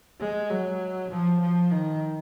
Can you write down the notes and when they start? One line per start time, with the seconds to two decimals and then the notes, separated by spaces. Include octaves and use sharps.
0.20 G#3
0.50 F#3
1.11 F3
1.41 F3
1.71 D#3